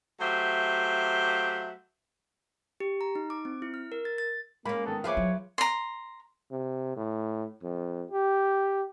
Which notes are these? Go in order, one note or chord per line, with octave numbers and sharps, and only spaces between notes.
F#3 A3 G4 C5 E5 F5
G4
A#5
D#4
D6
C4
E4
F6
A#4
A6
A6
G#3 A#3 C#4 B5
D#3 B3 A4
F3 G#4 B4 C#5 E5 F5 D6
F#3 E4
A#5 C6
C3
A2
F2
G4